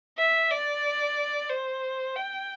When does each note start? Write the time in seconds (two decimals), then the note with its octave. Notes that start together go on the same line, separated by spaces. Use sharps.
0.18 E5
0.51 D5
1.50 C5
2.16 G5